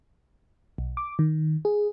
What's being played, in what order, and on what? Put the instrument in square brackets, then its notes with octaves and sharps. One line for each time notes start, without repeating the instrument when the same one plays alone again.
[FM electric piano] B1
D6
D#3
G#4